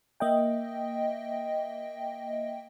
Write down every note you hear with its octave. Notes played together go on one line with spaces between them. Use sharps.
A#3 D#5 E5 G5